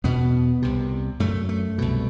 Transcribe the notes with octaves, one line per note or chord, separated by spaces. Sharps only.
E2 B2 B3
C2 C3
F#2 A3
A3
C2 B2